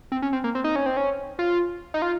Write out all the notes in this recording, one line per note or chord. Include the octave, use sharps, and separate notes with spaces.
C4
C#4
C4
A#3
C4
D#4
C#4
C4
C#4
F4
D#4
F4